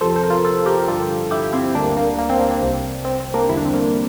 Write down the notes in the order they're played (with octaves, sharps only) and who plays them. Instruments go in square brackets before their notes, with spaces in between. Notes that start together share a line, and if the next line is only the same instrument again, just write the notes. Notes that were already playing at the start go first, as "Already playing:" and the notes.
[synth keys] F2 C3 F3 A4 C5
A4 C5
A#4
F4 A4
F4 A4
G4 A#4
G2 D3 F3 F4 A4
E4 G4
C4 E4
D2 D3 G3 A#3 D4
A#3
A#3
C4
A#3 D4
A#3 D4
C2 C3 G3
C4
C4
A#3 D4
E2 D3 G3 E4
D4
C4
A#3 D4